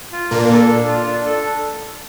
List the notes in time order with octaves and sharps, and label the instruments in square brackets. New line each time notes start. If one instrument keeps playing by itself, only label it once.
[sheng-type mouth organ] F4
[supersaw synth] A#2 A#3 [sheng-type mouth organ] D4
[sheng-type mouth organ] A4
D4
F4
D4
A4